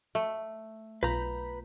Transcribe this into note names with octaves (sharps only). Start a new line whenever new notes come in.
A3
B1 F4 B4 A#5 B5 G6